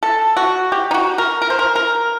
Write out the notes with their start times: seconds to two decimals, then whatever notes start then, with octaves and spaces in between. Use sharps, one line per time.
0.03 A4
0.37 F#4
0.72 G4
0.91 D#4
0.94 F#4
1.18 A#4
1.42 A#4
1.50 C5
1.59 A#4
1.76 A#4